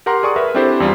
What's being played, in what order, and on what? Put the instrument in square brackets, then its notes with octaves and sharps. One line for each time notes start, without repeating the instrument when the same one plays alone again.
[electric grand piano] G4 A#4 F#5 A#5 C6
G#4 D5 C#6 D#6
A#4 B4 E5
C4 D4 E4 G4 A4 C5
E2 G3 F4